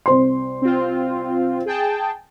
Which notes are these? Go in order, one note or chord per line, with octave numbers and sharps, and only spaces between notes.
C2 C5 C6
C4 F4
G#4 G5 A5